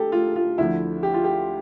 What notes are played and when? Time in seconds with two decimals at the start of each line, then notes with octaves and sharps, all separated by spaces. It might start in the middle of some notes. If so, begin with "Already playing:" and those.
Already playing: D3 G4 A4
0.12 F4
0.36 F4
0.58 D2 D3 F3 E4
1.03 G4
1.14 F4
1.24 G4